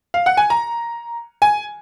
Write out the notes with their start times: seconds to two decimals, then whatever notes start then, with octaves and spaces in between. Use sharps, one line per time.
0.14 F5
0.26 F#5
0.37 G#5
0.50 A#5
1.42 G#5